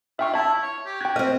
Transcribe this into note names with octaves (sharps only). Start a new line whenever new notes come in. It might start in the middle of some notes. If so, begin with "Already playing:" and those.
F4 E5 G5 C#6
E4 E5 A5
C#5
G4
F#4 G5 G#6
C4 D#5 F6